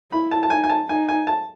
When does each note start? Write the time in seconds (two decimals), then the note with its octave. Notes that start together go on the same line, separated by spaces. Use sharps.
0.11 E4 B5
0.31 A5
0.43 A5
0.50 D#4 G#5
0.64 G#5
0.69 A5
0.88 D#4 G#5
1.08 G#5
1.27 A5